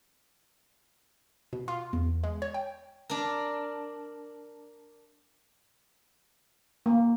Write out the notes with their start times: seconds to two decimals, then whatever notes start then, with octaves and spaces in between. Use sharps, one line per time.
1.53 B2
1.68 F4
1.93 E2
2.24 G#3
2.42 C#5
2.54 G5
3.09 D4 A#4
6.86 A#3